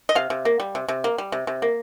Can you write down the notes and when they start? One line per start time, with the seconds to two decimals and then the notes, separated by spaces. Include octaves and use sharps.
0.09 D#5
0.15 C3 F5
0.30 C3
0.45 A#3
0.60 G3
0.75 C3
0.88 C3
1.04 A#3
1.18 G3
1.32 C3
1.47 C3
1.62 A#3